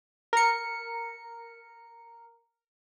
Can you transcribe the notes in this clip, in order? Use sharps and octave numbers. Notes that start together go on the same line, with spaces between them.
A#4 C#7